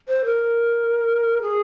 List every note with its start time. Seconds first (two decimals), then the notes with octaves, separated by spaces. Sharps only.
0.08 C5
0.25 A#4
1.42 G#4